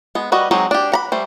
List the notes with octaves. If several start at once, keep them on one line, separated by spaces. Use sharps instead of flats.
G#3 B3
G3 F#4 B4 D#5
F#3 G#3 C4 D#4
D4 G4
F#5 A#5 B5
G3 A3 C5